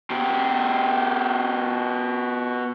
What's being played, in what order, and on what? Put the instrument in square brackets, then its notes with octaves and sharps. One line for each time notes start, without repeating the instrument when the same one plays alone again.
[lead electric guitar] B2 G4